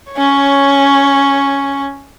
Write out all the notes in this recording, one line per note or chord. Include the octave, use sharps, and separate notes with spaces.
C#4 C#5